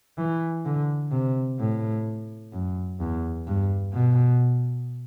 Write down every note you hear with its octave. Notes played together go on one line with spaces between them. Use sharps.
E3
D3
C3
A2
F#2
E2
G2
B2